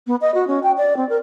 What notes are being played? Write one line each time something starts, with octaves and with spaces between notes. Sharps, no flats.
B3
D#5
F#4
C#4
G5
D5
C4
A#4